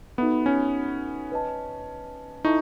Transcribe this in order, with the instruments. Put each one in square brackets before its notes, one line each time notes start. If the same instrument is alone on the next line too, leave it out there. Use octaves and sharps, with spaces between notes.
[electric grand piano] B3 [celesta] D#4 F#4 A4 E5 B5
[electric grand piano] C#4
[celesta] B4 D#5 A5
[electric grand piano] D#4 [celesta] E4 A4 E5 A5 C#6